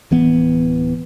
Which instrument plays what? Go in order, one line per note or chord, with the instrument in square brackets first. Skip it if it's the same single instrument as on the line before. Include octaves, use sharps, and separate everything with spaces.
[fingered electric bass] D1 E3 B3